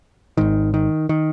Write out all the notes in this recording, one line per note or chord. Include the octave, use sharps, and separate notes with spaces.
G#1 G#2 D#3
D#3
D#3